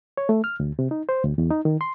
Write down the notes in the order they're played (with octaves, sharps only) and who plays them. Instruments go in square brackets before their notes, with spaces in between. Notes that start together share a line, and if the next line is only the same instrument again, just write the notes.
[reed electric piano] C#5
A3
F6
D2
C3
D#4
C5
D2
E2
D#4
D#3
C6